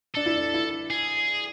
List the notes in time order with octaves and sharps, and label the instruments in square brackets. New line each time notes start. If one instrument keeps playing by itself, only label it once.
[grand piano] D4 [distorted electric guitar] A4
[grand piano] E4
D4
E4
[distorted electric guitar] G#4